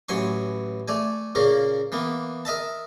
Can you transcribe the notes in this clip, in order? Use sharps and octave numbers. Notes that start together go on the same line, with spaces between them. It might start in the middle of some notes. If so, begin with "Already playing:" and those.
A1 E3 F#3 G#5 C6 C#6
A3 D5 G#5
A#2 C#3 A#3 C#4 A#4
E3 A#3 B3
A#4 D#5 E5 A5